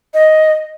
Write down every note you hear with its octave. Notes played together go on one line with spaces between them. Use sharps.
D#5